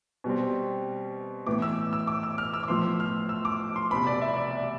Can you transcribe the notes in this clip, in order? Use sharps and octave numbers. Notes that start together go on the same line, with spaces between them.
B2 G3 C4
A2 E3 B3 D6
E6
E6
D6
E6
F6
E6
D6
A2 F3 B3 C6
F6
E6
D6
C6
C2 B2 B3 B5
D5
E5
D5